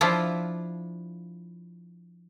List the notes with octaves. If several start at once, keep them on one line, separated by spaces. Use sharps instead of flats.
F3 D4 E4 F4